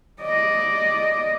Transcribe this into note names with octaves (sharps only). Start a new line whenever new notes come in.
D5 D#5